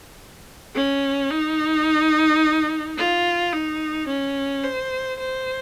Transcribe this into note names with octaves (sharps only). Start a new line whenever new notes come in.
C#4
D#4
F4
D#4
C#4
C5
C5